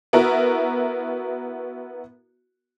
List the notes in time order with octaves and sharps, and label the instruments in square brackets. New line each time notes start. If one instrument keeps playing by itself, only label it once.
[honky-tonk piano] B3 E4 F#4 A#4